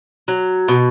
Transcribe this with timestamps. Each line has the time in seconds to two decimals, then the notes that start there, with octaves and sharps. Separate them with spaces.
0.28 F#3
0.68 B2